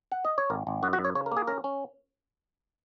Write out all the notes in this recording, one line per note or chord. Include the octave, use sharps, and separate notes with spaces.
F#5
D#5
C#5
G#1 A#4
G#1
F#2 F#4
F#4
F#2
C#5
C#3 C#5
A#4
A#3 G#4
C#4 A#4
C#4